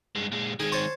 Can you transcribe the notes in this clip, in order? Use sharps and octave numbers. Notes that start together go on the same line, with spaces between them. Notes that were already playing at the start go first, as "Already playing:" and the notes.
G2 G#3
A#2 G#3
D#3 G#3 G#4
C5 C#5 A5